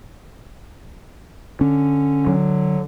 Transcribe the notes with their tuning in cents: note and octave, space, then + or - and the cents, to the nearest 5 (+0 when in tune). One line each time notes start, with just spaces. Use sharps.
D3 +0 C#4 +0
D3 +15 F#3 +0